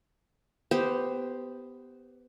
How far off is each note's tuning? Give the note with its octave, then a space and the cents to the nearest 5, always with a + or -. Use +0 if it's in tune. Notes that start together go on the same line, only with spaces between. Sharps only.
B3 +15 G4 +0 C5 +0